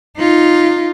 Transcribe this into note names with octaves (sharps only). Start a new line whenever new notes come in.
D#4 F4